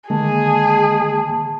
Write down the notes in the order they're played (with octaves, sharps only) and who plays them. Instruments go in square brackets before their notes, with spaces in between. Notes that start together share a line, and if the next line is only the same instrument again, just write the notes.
[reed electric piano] D3 D#3 A#3 [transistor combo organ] G#3 [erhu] G#4 [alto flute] A5